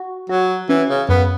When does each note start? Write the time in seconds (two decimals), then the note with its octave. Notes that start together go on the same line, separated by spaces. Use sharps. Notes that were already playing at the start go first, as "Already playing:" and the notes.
Already playing: F#4
0.29 F#3 F#4
0.69 E3 C#4
0.89 C#3
1.09 F#2 B3